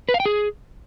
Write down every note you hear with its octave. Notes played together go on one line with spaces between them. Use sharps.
B4
F5
G5
G#4